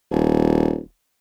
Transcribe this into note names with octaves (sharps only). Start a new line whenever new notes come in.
D#1